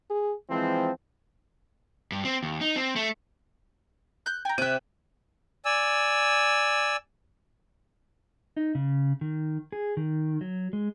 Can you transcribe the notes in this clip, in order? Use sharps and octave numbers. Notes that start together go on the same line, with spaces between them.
G#4
E3 F3 G#3 C4
G2
C4
D#2
D#4
C4
A3
F#6 G6
G5 G#5 A#5
C3 E5 D6 F#6 D#7
D5 G#5 E6
D#4
C#3
D#3
G#4
D#3
F#3
G#3